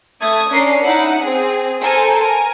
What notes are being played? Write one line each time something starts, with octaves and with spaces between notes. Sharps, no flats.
A3 D#6 G#6
C#4 D4 A#4 C7
D#4 E4 F#5
C4 G#4
A4 A#4 C5 G#5
A#4 G#5